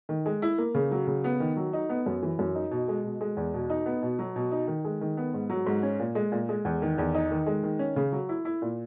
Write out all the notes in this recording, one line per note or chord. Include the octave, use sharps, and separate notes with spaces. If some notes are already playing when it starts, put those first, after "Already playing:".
D#3
G#3
E4
A#3
C#3
F#3
C#3
B3
D#3
F#3
D#4
B3
F#2
E3
F#2
D#4
B2
G#3
B2
G#3
E2
B2
D#4
B3
B2
F#3
B2
D#4
D#3
G#3
D#3
B3
G#2
F#3
G#2
C#4
A#2
G#3
A#2
G#3
E2
D#3
E2
D#4
D#3
G#3
D#3
C#4
C#3
F#3
E4
E4
A#2